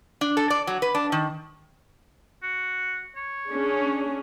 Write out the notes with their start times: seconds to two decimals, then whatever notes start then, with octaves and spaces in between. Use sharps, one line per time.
0.21 D4
0.37 A4
0.50 D5
0.67 F#3
0.82 B4
0.95 D4
1.12 D#3
2.43 F#4
3.16 C#5
3.49 C#4 D4 G#4